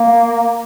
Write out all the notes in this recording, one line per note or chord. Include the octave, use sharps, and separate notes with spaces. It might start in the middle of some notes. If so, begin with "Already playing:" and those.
Already playing: A#3